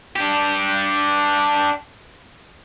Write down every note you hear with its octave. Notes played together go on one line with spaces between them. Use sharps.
D4 G4